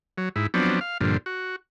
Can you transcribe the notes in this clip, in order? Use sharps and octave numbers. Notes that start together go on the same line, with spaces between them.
F#3
G#2 E4
F3 F#3 B3 C4 D4
F5
G2 A#2 D3 F3
F#4